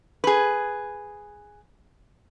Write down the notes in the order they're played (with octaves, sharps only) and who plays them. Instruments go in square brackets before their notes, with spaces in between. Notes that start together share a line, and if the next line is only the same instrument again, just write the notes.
[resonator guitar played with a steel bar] G#4 B4